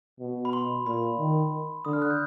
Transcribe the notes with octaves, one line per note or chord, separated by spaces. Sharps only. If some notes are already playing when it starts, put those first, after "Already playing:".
B2
B5
C6
A#2 B5
D#3
D3 D#6
F6
F#6
G6